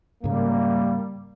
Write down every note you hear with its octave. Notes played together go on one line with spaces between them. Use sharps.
G#2 C#3 G3 A#3